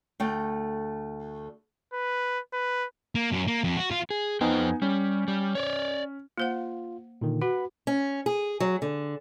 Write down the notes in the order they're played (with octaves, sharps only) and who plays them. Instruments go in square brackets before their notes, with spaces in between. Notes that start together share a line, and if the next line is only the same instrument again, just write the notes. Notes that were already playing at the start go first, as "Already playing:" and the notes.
[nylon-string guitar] D2 A3 G5
[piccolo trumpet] B4
B4
[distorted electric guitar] A#3
F#2
A#3
F2
F#4
F4
[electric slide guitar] G#4
[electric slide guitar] F2 C5 G5 [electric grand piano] B3 D#4 G#5
[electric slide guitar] G3 [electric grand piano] C#4
[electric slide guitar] G3
C#5 D5
[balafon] A#3 C5 F#5 [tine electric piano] F4
[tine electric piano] A#2 D3 D#3
[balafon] F#4 [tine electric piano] B4 F#5 B5
[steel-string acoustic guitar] C#4
G#4
F#3
D3